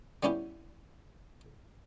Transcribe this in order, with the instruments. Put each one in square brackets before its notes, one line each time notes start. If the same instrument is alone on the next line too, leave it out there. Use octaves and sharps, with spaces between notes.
[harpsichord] G3 B3 C#4 E4 G4